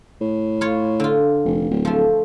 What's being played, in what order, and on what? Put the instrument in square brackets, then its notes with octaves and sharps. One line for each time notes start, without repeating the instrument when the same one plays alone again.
[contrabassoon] A2
[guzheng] F4 C#5
D3 F4
[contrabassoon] F1
D1
[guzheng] F3 A3